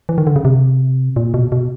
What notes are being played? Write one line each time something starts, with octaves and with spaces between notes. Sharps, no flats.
E3
D#3
D3
C#3
C3
A#2
B2
B2